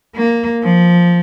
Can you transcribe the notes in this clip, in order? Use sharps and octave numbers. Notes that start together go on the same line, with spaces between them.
A#3
F3